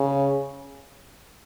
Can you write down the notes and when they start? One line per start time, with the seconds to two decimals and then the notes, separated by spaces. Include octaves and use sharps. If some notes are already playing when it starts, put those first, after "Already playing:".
Already playing: C#3